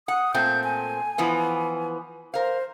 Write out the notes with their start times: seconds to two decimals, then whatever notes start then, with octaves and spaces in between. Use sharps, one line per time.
0.08 F#5 D#6
0.34 A#2 A3 C4 G6
0.64 G#5
1.18 E3 F3 B3
2.34 A#4 C5 F5